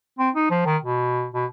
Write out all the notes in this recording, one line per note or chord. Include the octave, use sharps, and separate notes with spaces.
C4
D#4
F3
D#3
B2
B2